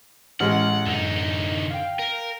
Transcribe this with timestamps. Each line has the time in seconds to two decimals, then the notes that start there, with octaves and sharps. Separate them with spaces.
0.40 A1 G#3 F#5 F6
0.86 F#2 D3 D#4
1.70 F5 G5
1.99 A#4